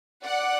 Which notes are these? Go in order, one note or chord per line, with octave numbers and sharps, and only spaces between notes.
D5 F#5